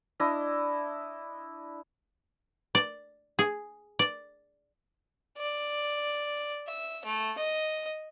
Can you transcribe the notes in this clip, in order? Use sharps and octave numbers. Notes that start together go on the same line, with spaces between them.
D4 E4 D#5
D5
G#4
D5
D5
E5
A3
D#5